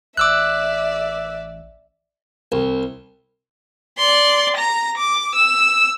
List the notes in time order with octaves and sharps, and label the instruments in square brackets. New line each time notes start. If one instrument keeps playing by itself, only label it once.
[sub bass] A1 [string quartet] D5 E5 [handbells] D6 E6 F#6
[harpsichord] C2
[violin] D5 C6
A#5 A#6
D6
E6